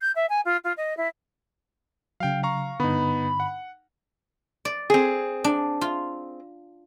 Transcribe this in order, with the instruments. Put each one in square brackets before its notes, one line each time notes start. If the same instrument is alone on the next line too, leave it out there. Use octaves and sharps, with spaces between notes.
[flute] G6
E5
G#5
F4
F4
D#5
E4
[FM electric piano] C#3 F#3 [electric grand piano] F5 G5
[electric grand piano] F5 A#5 C#6
[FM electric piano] G2 D3 [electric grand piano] B3 D#4 [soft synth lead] B5
[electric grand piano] F#5
[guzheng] D5
[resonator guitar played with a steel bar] C4 G#4
[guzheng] D4
F4